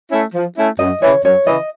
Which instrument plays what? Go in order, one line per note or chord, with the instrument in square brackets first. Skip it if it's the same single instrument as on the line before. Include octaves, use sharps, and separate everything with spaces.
[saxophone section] A3 C#4 E4
F3
A3 C#4 E4
[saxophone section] F#2 [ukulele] D#5
[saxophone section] C#3 E3 [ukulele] C#5
[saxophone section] F#2 [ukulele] C#5
[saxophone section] C#3 E3 [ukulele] D#5